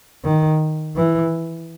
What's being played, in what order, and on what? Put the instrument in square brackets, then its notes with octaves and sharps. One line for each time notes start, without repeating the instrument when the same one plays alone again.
[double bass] D#3
E3